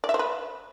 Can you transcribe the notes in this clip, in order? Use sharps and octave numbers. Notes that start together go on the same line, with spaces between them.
D5
E5
C5
B4